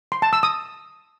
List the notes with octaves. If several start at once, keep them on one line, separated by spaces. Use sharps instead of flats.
C6
A5
E6
D#6